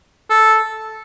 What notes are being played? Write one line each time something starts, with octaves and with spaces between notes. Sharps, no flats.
A4